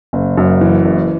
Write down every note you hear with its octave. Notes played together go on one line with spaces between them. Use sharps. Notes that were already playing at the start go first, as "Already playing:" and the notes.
F#1
F#2
E3
F#1